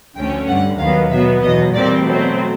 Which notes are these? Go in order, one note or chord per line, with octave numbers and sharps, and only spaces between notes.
D2 D3 F3 A3 C#4 G5
G2 D3 G3 F#5
D#2 D#3 F#3 B3 F5
B2 F#3 B3 E5
E2 B2 F#3 D#5
A#2 G3 C4 D5
B2 F#3 A3 C4